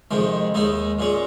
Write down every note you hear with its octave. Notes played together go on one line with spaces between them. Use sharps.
F2 C3 D#3 G#3
D#2 D#3 G#3 D#4
A#2 G#3 C#4